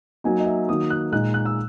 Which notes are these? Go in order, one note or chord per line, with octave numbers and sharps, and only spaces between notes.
F#3 A#3 D#4 G#5
D#5
E5
D#3 F#3 A#3 D#4 D#6
F#6
A#2 G#3 D#4 F#6
F#6
E6